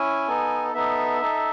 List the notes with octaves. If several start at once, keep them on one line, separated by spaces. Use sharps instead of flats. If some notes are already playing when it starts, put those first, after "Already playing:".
Already playing: C#4 E4 G#5
B3 D#4 A4
B3 D#4 A4 E5
D#4 A4